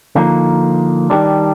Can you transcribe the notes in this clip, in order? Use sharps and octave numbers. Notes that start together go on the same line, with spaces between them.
D3 F3 A#3 D#4
D#3 G3 D4